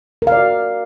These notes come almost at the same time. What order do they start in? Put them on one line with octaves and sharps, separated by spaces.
A#4 F5 D5 F#4